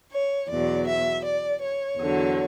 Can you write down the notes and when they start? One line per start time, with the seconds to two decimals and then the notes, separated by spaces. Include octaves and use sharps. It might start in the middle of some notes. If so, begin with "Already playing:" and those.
0.12 C#5
0.50 E2 B2 F#3 D5
0.87 E5
1.24 D5
1.61 C#5
1.99 E2 D3 F#3